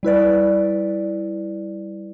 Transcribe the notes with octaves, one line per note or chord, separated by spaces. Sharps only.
G3 E4 B4 D5